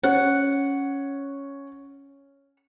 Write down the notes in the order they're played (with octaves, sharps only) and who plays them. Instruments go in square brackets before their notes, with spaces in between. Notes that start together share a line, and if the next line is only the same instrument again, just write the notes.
[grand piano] C#4 [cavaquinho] F#5